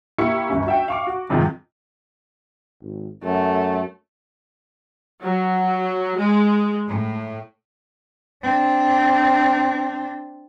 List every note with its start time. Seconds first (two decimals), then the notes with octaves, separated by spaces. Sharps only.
0.18 A#3 E4 G4 C#6 C#7
0.50 G1 C#2 C#4
0.66 F#4 E5 G5
0.88 F5 C#6 D6
1.07 F#4
1.30 E2 G2 C3 D#3 F3 G#3
2.81 G#1
3.24 F#2 A3
5.22 F#3
6.18 G#3
6.87 A2
8.43 C4 D4